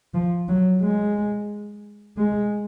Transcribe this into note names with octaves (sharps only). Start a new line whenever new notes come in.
F3
F#3
G#3
G#3